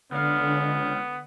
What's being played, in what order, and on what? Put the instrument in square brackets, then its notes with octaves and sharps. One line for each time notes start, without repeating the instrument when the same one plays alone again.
[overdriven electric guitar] C#2 F5 [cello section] D3 [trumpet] B3